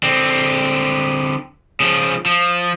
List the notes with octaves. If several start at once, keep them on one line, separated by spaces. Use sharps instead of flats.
D3 C4
C#3 F3
F3